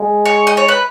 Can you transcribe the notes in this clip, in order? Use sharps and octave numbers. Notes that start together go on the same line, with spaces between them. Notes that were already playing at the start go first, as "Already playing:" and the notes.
Already playing: G#3
C#5
D#5
C#5
B4